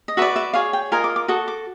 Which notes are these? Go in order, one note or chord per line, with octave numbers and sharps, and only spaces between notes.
D#5
F#4 B4 D5 E5
E5
G#4 C#5 F5
G5
F4 A#4 D#5 G#5
D6
D6
F#4 A4 D#6
D6